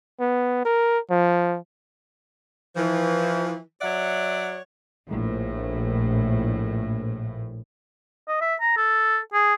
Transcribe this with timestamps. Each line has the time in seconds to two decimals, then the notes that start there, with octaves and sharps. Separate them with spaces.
0.20 B3
0.65 A#4
1.11 F3
2.76 E3 F3
3.82 F#3 C#5 D5 E5 F#5
5.09 A#1 A2
8.28 D#5
8.41 E5
8.61 A#5
8.77 A4
9.34 G#4